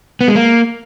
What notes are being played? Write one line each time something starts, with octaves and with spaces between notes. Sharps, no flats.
B3
G#3
A#3